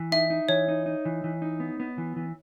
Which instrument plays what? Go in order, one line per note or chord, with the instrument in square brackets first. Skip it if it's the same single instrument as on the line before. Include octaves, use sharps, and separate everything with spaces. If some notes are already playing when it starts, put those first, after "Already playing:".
Already playing: [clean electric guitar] E3
[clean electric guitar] D#4 [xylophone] E5
[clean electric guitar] D#4
[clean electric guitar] E3 [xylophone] C#5
[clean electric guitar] D#4
D#4
E3
E3
D#4
B3
B3
E3
E3